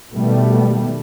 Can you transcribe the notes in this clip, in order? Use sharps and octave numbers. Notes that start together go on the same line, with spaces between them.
B2 D#3 G3 A3 B3